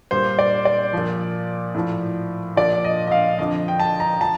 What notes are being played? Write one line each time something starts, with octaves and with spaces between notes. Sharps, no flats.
A#2 G3 C5
D5
D5
A#2 F3
A2 F3
A#2 F3 D5
D#5
D#5
F5
F2 D3 F3 D#5
G5
A5
A#5
F3 A5